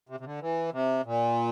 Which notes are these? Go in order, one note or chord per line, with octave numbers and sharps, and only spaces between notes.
C3
C3
D3
E3
C3
A#2